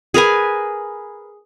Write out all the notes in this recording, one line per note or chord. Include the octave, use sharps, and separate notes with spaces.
G#4 A#4 B4 G#5